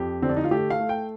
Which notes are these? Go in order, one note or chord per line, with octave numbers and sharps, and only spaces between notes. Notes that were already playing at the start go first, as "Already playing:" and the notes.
Already playing: F2 G4
D3 C4
D4
D#4
F4
A3 G4
F5
A3
G5